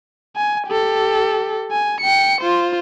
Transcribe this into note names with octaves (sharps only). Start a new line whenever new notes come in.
G#5
G4 A4
G#5
G5 C#7
F4 C5